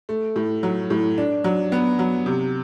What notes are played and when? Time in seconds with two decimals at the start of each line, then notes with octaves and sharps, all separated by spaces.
0.09 A3
0.36 A2
0.63 F#3
0.90 A2
1.18 D4
1.44 F#3
1.72 B3
1.99 F#3
2.26 C3